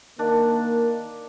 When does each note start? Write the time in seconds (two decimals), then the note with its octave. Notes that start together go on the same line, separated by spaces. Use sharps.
0.19 D#3 A#3 D4